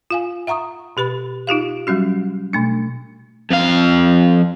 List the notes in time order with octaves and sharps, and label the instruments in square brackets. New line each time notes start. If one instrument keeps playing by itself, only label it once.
[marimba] F4 F5 G#5
E5 F#5 A#5 C#6 D#6
B2 G4 B4 B5
D#4 F4 G4 F5
F#3 G3 C#4 F#4
B2 A3 D4
[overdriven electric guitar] F2 F5